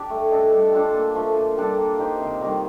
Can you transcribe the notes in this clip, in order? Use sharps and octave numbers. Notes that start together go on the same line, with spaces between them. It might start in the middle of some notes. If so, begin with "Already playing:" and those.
Already playing: D4 G4
A3
D4 A4 D#5
G3
D4 F4 A4
A#2
F3 A3
A#2
G3 D4 A4
A#3
D#4 G4 C5
C3
D#3 G3 A#3